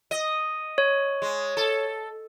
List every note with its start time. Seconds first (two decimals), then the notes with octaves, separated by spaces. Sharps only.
0.11 D#5
0.78 C#5
1.22 G#3
1.57 A4